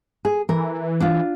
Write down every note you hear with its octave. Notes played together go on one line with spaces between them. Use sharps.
G#4
E3 A#4
D4 F4